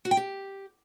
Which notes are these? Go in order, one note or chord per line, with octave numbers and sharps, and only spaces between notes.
F#4
G5
G4